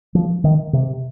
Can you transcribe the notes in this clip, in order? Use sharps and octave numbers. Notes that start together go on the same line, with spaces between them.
F3
D#3
C3